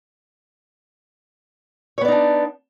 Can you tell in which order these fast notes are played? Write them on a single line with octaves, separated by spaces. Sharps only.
C#5 B3 D5 D#4 D4